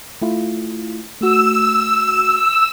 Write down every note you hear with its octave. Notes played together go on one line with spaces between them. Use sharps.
A3 E4 F4
A3 F#4 E6